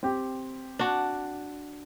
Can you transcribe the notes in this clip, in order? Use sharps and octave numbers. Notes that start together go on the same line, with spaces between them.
C4 G4
D4 F#4